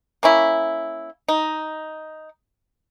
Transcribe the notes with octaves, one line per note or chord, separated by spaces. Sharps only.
A#3 C#4 E4
D#4